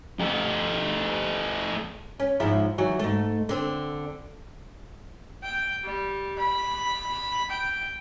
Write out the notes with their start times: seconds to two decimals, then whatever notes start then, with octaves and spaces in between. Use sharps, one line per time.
0.19 A3 G4
2.20 C#4
2.40 G#2 F3 E4
2.78 D#3 E3 F#3
2.99 G#2 A3
3.49 D3 C4
5.43 G5
5.84 G3
6.38 B5
7.50 G5